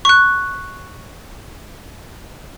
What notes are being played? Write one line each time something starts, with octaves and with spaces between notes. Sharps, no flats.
C#6 F#6